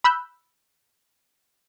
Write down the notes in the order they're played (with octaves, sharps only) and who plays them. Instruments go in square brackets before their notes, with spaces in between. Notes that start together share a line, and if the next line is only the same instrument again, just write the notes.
[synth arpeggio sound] B5 E6 F#6 G6